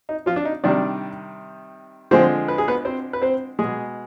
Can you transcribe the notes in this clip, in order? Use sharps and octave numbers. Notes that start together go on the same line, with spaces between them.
D#4
F3 F4
D4
D#4
C3 D#3 G3 D4 D5
D3 F3 G#3 C4 C5
B4
G#4
B3 B4
C4 C5
B4
C4 C5
G#3 G#4
B2